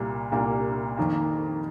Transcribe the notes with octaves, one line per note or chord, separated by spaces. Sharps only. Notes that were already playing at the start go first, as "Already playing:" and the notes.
Already playing: C2 A#2 G3 A#3
C2 A#2 G3 A#3
F2 D#3 A#3